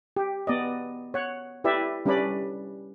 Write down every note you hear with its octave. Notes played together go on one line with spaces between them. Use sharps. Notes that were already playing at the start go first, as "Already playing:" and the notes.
G4
B3 D5 D#5
C#5 F#5
E4 G4 B4 D5 E5
G3 C#4 D4 B4 D5 B5